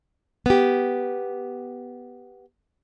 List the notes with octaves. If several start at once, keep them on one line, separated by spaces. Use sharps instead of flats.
B3 G4